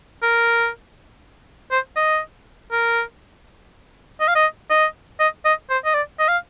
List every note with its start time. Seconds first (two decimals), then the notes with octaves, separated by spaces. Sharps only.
0.23 A#4
1.71 C5
1.96 D#5
2.72 A#4
4.20 D#5
4.28 F5
4.35 D#5
4.70 D#5
5.20 D#5
5.45 D#5
5.70 C5
5.85 D#5
5.94 D5
6.19 D#5
6.28 F5